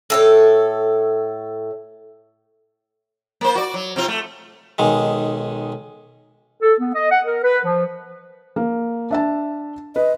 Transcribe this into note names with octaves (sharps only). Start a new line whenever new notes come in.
A2 A4 C#5
A#3 C5
F#4 D5
F#3
C3 C4 F4
A3
B1 D#3 G#3
A4
B3
D#5
F#5
A#4
B4
F3
A#3
D4 E5 A5
B4 D#5